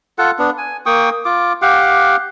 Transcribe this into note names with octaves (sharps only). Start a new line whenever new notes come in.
F4 A4 F#5
B3 D4
G#5
A#3 G5 C#6 D#6
F4 D6
G4 F5 F#5 D6